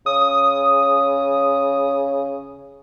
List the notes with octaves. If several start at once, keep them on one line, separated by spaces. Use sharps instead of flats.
C#3 D#6